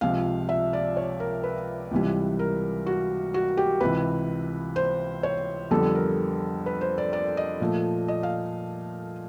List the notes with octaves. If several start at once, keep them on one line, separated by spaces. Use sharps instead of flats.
C#2 C3 F3 F5
E5
D5
C#5
A#4
B4
C#2 C3 E3 G3
A#4
F#4
F#4
G4
C#2 C3 E3 B4
C5
C#5
F2 D3 G3 B3 A4
A#4
B4
C5
D5
D5
D#5
A#2 F3 A3
D#5
F5